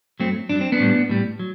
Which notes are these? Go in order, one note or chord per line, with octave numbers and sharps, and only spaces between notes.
G2 F#3 A3 C4
G2 F#3 D4
C4
B3 D4
A2 G3
A2 G3
F#3